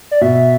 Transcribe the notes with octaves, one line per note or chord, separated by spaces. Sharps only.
D5
B2 E5